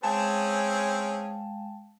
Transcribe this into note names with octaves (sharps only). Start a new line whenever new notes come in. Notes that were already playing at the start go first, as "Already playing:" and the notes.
G#3 C4 C#4 G#4 F5 G5 A5